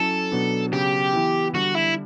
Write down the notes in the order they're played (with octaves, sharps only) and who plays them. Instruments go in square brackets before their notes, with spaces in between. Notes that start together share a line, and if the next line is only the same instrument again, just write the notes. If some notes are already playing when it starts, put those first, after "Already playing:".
Already playing: [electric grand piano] F#3 C#4 E4 [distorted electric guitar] A4
[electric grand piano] B2 F#3 B3 D4
[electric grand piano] C#3 F#3 B3 [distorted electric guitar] G4
[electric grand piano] E3 B3 E4
[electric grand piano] D3 G3 D4 [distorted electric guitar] F#4
[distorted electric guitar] E4